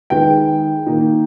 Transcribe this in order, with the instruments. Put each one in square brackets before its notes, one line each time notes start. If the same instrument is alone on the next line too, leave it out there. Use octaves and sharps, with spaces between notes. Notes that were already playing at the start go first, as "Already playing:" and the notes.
[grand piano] D#3 G#3 D#4 G#4 B4 [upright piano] G5
[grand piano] D#3 A#3 D#4